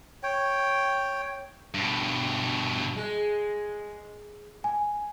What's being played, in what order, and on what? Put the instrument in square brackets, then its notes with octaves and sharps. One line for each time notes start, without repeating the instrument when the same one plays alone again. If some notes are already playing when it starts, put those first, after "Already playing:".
[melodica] C#5 G5
[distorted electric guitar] G2 B2
[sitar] G#3
[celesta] G#5